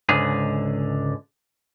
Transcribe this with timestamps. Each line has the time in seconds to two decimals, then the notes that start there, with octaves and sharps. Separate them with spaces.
0.09 C#2 G#2 D3 G#4